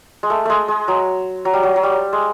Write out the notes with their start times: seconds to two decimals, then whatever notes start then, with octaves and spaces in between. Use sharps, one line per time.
0.23 G#3
0.30 A3
0.45 G#3 A3
0.68 G#3
0.88 F#3
1.45 F#3
1.53 G3
1.63 F#3
1.76 F#3
1.83 G3
2.13 G#3